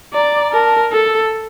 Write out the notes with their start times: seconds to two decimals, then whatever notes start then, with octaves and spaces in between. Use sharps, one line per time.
0.13 D5 A#5
0.53 A#4 A5
0.92 A4